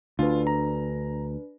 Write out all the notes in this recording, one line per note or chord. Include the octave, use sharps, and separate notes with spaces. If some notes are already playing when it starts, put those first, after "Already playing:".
D2 D4 F4 B4
A#5